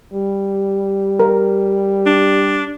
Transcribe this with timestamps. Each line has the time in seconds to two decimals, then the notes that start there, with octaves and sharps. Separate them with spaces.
0.13 G3
1.20 A#4
2.06 D4